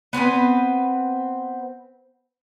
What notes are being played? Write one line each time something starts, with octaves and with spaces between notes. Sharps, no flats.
B3 C4 B4 G#5